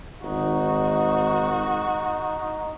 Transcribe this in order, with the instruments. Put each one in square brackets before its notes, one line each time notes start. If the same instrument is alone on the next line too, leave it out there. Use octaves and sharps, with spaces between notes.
[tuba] G#1 [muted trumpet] D#4 [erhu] F#4